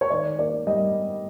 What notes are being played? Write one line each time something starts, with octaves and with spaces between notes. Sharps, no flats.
C#5
D#3 D5
A#3 D5
G3 D#5